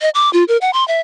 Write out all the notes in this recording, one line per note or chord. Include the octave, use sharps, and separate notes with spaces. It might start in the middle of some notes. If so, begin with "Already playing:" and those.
D#5
D6
F4
A#4
F#5
C6
E5